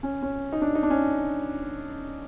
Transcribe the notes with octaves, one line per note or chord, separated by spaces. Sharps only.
C#4
C#4
D#4
D4
D#4
D4
C#4